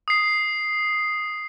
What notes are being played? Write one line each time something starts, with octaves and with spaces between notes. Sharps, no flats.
D#6 C7